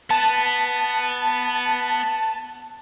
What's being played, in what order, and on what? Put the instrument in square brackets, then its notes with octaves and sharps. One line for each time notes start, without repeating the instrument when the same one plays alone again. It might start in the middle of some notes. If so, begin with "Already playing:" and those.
[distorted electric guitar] B3 [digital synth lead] A5